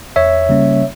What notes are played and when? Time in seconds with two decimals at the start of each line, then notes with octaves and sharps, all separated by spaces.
0.16 E2 C#5 E5
0.49 C#3 G3 A#3 C#4